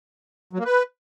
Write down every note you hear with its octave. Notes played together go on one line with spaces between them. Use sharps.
F#3
A#3
B4